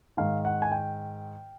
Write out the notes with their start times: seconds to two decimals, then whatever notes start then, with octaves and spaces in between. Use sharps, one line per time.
0.17 G#2 D#3 F5
0.45 F#5
0.62 G#5
0.72 G5